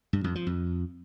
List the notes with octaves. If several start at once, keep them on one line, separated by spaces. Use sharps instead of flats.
G2
F2
F3
F2